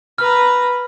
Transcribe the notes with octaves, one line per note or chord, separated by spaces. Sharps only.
B4 A#5 F6